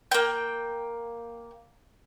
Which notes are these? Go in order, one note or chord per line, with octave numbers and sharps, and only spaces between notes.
A#3 G5